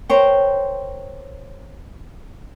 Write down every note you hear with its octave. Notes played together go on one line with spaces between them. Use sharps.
A#4 C5 C#5 G5